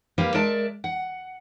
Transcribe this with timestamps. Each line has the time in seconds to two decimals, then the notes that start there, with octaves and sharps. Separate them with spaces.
0.18 G3 A#3 G4 B4 F5
0.34 G#3 A#4 D5 E5 A5
0.84 F#5